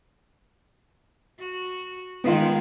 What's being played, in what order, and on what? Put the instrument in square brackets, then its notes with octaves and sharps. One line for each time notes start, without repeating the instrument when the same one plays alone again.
[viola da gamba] F#4
[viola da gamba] D#3 G#3 [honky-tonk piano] B3 F4